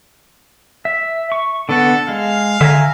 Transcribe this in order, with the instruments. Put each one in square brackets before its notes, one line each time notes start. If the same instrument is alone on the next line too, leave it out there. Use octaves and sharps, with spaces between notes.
[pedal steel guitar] E5
C#6
[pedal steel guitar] D3 B3 F#5 [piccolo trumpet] A4
[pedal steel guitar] G#3 [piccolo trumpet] F5
[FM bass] D3 [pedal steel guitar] E5 G#5 A#5